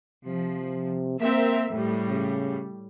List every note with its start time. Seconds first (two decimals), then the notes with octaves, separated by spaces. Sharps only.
0.25 C3 F3
1.20 A#3 C4 A#4 E5
1.70 A2 G3 A3
2.09 C#3